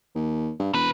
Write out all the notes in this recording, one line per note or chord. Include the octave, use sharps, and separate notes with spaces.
D#2
G2
E1 C3 B4